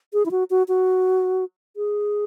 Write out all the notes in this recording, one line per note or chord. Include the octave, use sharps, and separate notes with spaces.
G#4
E4
F#4
F#4
F#4
G#4